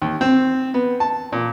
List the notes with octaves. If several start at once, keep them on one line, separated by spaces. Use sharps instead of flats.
D#2
C4
B3
A5
A#2